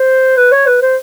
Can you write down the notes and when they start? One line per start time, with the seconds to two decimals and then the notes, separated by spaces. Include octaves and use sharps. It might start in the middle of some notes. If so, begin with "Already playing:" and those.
Already playing: C5
0.37 B4
0.52 C#5
0.67 B4
0.82 C5